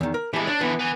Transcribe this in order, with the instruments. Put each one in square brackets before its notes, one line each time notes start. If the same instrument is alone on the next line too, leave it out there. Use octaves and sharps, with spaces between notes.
[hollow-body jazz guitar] E2 D#3
A#4
[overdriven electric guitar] E3 G#3 [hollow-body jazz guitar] G4 A5
[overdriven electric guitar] D4 [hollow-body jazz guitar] C#5
[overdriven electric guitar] D3 E3 [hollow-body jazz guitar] B3
[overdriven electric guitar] B4 G#5